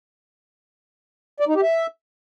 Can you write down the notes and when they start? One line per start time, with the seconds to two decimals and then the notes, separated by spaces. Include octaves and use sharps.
1.40 D5
1.48 D#4
1.55 G4
1.63 E5